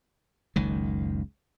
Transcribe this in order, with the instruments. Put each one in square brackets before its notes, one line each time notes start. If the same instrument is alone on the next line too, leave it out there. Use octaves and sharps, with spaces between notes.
[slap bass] F#1 C#2 D#3